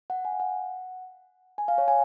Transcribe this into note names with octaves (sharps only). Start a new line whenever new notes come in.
F#5
G#5
F5
F#5
G#5
F5
C#5
G#5